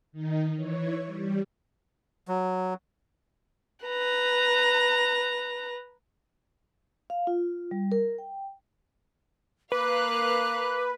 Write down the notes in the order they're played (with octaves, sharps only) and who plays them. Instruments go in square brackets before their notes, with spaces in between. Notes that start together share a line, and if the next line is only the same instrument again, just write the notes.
[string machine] D#3 D#4
E3 C#5
G3
[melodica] F#3
[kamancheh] B4 A#5
[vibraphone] F5
F4
G3
A#4
G5
[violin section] A#3 F5 F#6 [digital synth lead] B4 [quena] D6